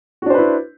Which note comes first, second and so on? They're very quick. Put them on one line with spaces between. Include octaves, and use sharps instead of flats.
F#4 D4 C5 B4 E4